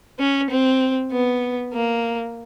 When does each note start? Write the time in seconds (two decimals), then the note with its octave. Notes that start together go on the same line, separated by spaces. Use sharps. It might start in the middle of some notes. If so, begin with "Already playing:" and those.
0.19 C#4
0.50 C4
1.12 B3
1.74 A#3